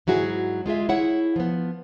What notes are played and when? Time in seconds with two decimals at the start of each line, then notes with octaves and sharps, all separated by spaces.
0.07 G#2 F#3 E4 F#4 G#4
0.66 G#3 F4 G#4 E5
0.89 E4 G#4 C#5 F#5
1.36 F3 B3